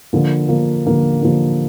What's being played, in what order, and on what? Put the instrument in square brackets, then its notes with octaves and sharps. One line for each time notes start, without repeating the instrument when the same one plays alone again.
[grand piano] D3 F3 A#3
D3 F3 A#3
D3 F3 A#3
D3 F3 A#3